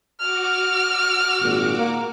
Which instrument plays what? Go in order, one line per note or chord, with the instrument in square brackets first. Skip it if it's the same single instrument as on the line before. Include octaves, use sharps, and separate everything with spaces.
[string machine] F#4 D6 [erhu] F6
[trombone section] G#1 A#2
A#3